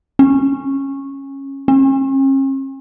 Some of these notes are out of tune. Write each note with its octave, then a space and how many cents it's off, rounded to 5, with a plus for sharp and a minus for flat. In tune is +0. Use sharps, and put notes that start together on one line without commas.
C#4 -15
C#4 -45